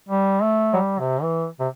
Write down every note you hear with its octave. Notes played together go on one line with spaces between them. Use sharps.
G3
A3
F#3
G3
C3
E3
C3